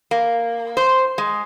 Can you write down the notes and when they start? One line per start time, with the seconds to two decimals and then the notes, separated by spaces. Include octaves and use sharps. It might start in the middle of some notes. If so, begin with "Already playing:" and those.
0.11 A#3
0.77 C5
1.18 G#3